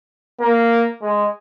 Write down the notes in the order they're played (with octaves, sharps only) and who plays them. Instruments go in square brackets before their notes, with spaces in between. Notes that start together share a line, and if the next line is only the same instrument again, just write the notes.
[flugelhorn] A#3
G#3